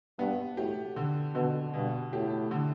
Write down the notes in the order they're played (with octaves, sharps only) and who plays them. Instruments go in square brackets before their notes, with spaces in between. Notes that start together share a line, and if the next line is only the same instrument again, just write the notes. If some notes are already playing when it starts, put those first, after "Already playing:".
[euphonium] G2 [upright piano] B3
[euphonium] A2 [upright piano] G4
[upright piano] D3
[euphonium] B2 [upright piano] D3
[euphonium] G2 [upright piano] B2
[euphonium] A2 [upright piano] G4
[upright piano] D3